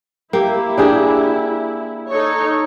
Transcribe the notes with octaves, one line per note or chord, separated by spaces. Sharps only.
A#3 E4 G4
D4 G4 G#4
D#4 A4 C#5